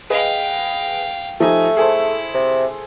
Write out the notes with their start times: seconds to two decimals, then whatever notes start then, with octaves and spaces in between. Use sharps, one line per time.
0.10 G#4 B4 D#5 F5 G5
1.40 F3 A3 D#4 G4 G#5
1.77 E4 G#4 A4 C5
2.34 C3